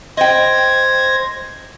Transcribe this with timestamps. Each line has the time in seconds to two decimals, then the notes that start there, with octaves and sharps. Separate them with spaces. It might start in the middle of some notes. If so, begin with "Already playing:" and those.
0.17 C5 D#5 G5 G#6 A#6